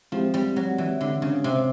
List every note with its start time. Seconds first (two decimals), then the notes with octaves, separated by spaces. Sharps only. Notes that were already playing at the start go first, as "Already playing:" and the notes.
0.12 F3 G#3 C4 E4 G4
0.34 G3
0.56 F#3
0.78 E3
1.01 D3
1.22 C#3
1.44 C3